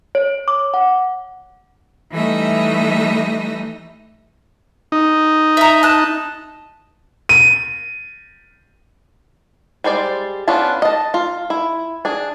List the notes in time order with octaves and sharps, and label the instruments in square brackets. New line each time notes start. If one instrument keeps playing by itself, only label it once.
[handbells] C#5
D6
F#5
[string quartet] E3 G3 A3 D#4 D#5 E5
[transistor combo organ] D#4
[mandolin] E5 A#5
A5 F#6
[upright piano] D#7
[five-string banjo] G3 G#3 C5 D5
B3 C#4 D4 F4 A5
D#5 A5
F4
E4
D4 G#4